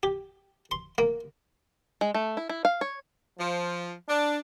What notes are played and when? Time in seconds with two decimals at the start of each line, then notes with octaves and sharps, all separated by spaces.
0.03 G4
0.71 C6
0.98 A#3
2.01 G#3
2.14 A3
2.37 E4
2.49 E4
2.65 F5
2.81 C#5
3.38 F3
4.08 D4